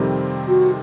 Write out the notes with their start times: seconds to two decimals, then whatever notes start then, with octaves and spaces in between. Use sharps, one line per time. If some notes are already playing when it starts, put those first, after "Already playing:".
Already playing: F2 C3 D#3 G3 C4
0.48 F#4